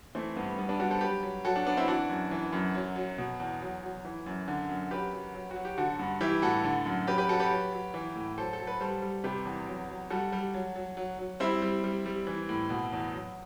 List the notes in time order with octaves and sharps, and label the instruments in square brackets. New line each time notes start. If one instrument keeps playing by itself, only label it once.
[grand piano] E3 A3 C4
G2 B3
G3 B3
B3 D4
G3 D4 F#4
A4 C5
F#3 G4 B4
F#3
F#3 F#4 A4
D4 F#4
F#3 B3 D4
C4 E4
E3 D4 F#4
F#2
E3
F#2
F#3
F#3
B2
E2
F#3
F#3
E3
F#2
D3
F#2
F#3 G4 B4
F#3
F#3
F#4
F#3
G4
D3 F#4 A4
G2
E3 E4 G4
A2 F#4 A4
D3
F#2
F#3 G4 B4
G4 B4
F#3 F#4 A4
G4 B4
F#3
F#3
E3
A2
F#3 A4 C5
A4
F#3
B4
G3 A4 C5
G3
C3 G4 B4
E2
F#3
F#3
G3 F#4 A4
G3
F#3
F#3
F#3
F#3
G3 C4 E4
G3
G3
G3
E3
A2
B2
E2
F#3